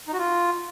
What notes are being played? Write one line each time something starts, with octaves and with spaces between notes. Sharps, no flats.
D#4
F#4
F4